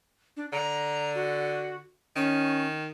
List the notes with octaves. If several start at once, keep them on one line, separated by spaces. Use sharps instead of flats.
D4
D3 A#5
F#4
D#3 C#4